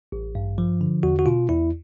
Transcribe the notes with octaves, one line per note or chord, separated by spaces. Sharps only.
A1
G2
F3
D3
E2 F#4
F#4
B2 F4
E2 E4